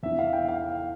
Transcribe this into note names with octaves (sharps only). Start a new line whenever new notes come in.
E2 E3 E5
F5
G5
F5
F5